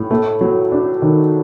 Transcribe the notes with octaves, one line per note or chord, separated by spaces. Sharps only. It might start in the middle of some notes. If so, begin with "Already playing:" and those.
Already playing: A2
A3
F#3
D4
D#3